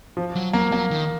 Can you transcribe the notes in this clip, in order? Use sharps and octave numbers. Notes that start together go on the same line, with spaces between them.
F3
F#3
F#3 A#3
F#3 A#3
D#3